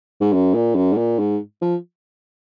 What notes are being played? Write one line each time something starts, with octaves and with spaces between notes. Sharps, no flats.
G#2
F#2
A#2
F#2
G#2
A#2
G#2
F3